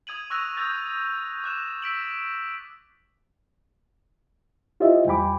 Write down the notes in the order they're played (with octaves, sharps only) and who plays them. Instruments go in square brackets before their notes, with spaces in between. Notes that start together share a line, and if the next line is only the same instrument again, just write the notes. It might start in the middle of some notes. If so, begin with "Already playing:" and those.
[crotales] D#6 G#6 D#7 F#7
C#6 E6 F#6 A#6 D#7 F7
D#6 E6 F#6 G6 A6
D6 F#6 E7
E6 B6 D7 F#7
[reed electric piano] E4 F4 G4 C5 D#5 E5
E2 G3 G5 G#5 B5 D6